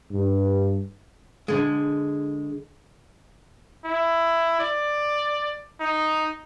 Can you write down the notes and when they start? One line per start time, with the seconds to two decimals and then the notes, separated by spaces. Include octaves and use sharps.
0.11 G2
1.48 D3 G#3
3.85 E4
4.60 D5
5.80 D#4